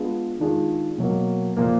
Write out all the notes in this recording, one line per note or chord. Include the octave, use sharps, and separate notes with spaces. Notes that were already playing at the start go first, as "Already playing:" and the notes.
Already playing: G#3 B3 D4 F4
D#3 G#3 D4 F4 G#4
B2 F#3 A#3
A#2 F3 A#3